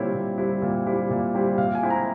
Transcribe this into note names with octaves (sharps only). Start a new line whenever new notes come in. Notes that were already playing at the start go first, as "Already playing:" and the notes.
Already playing: A#2 G3 C4 E4 C#5 E5
A#2
G3 C4 E4
A#2
G3 C4 E4
A#2
G3 C4 E4
A#2 F5
G#5
G#3 C4 E4
A#5